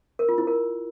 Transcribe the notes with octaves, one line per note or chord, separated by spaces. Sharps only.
A#4
F4
E4
A#4